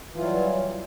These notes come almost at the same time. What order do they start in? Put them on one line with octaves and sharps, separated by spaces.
E3 F4 F#3 G3